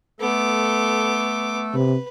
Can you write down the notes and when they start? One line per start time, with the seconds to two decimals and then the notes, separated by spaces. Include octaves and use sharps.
0.21 A3 B3 A4 D6
1.74 C3 B4